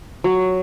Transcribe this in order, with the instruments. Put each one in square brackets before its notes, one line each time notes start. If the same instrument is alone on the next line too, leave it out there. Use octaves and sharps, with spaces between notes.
[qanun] F#3